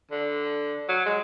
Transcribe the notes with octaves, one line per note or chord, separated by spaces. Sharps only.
D3
F#3
G#3